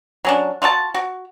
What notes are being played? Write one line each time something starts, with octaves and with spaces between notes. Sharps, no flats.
F#3 C#4 D4
F4 F#4 E5 A5
F#4